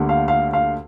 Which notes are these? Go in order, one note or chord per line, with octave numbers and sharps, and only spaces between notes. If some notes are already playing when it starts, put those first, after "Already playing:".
Already playing: D2 D3 G3 A#3
F5
F5
F5